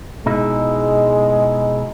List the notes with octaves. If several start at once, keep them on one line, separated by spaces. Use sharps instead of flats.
B2 G#3 D#4 E4